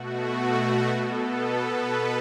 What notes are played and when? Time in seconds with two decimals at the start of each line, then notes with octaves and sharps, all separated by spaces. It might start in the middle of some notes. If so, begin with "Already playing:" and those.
Already playing: B2 A3 F#4
0.89 B2 B3 A4
1.40 B4